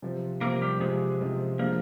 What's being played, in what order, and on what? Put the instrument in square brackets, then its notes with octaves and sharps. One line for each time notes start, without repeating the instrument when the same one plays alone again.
[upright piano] C3 F3 C4
[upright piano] C3 F3 C4 [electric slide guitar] A#3 A#4
[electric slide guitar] G3 G4
[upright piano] C3 F3 C4 [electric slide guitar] G#3 G#4
[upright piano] C3 F3 C4
[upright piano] F3 G#3 D4 [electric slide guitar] A#3 A#4